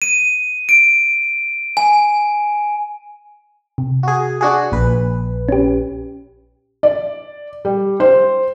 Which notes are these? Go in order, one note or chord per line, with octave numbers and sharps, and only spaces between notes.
D#7
D7
G#5
C3
F#4 G#4
D4 F#4 G#4
A#1 B4
C#4 G4
D5
G3
C5